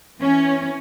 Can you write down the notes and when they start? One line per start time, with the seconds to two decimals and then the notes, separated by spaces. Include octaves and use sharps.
0.20 E3 C#4